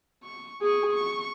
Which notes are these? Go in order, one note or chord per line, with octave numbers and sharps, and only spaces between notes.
C#6
G#4 C#6
C#6